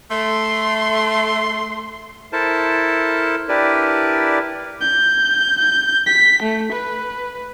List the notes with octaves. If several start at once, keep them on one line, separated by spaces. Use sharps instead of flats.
A3 C6
E4 A4 A#4 C5 A5
D4 E4 G4 A#4 B4 D5
G6
G6
B6
A3
B4